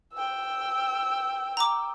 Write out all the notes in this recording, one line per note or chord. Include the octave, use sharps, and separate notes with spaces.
G5 E6
A#5 D6